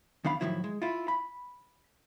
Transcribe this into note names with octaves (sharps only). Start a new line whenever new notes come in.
E2 D#3 D4 F5 B5
A2 D#3 F3 F#3 E4
G#3
E4 F4
B5